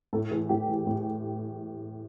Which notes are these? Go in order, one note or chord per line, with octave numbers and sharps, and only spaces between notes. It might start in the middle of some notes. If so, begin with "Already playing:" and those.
A2 A4
E3 G#4
A2 G4
E3
A2